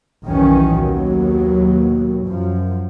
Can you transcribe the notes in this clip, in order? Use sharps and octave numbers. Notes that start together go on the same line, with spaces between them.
B1 E2 G2 D#3 E3 C#4
D#2 B2 F#3
F#2 F3